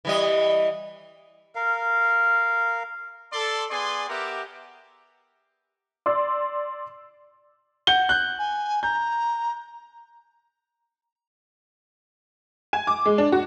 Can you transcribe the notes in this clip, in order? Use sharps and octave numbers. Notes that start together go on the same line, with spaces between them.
E3 G3 D#5
A#4 F5
A4 D5 C6
B3 G#4 D5 G#5 C6
B3 G4 A#4 E5 F#5 D6
D5 C6 E6
F#5 G6 G7
F#6 G6
G#5
A#5 G6
G#5
D6
G#3
D4
F#4